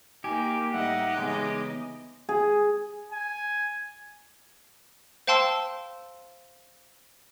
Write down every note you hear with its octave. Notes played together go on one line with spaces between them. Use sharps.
A#3 D#4 G4 G#5
A2 G3 D#4 D#5 E5 F#5
C#3 E3 G#3 B3
G#4
G#5
C5 F5 G5 A5 C6 E6